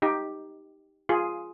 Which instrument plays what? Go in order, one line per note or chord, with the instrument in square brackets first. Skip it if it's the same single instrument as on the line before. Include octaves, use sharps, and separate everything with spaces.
[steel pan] D#4 G4
F4 G#4